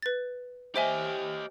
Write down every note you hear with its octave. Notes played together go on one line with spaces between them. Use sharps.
B4 A6
G4 C5 D#5 E5 G#5